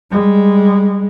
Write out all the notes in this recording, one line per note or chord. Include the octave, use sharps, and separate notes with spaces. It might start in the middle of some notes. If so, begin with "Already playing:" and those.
G3 G#3